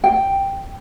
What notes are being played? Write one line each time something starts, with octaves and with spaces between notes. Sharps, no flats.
G5